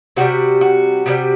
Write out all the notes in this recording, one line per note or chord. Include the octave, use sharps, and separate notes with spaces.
C3 D#3 G3 F#4
F#4
C3 D#3 G3